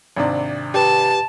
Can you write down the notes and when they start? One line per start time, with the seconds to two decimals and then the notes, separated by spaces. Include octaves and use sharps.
0.16 G#1 C3 D4
0.74 G4 B4 A5